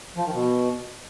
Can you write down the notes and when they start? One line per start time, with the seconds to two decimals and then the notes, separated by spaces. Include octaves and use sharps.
0.17 F3
0.25 D#3
0.34 B2